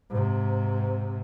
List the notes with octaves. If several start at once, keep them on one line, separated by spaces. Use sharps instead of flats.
G#2 C3